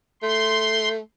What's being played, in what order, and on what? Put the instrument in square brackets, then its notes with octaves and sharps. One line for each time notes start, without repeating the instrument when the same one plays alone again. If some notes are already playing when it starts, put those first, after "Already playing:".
[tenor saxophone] A3 [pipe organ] C6